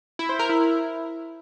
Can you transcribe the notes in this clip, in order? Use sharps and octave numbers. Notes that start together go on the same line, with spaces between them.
E4
C5
A#4
E4